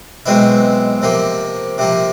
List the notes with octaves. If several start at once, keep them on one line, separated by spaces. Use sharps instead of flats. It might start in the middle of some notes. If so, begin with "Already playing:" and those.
B1 B2 G#3 C4 E4
C3 F3 A#3
C3 F3 A#3